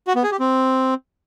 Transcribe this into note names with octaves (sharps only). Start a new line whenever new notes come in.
F#4
B3
G#4
G4
C4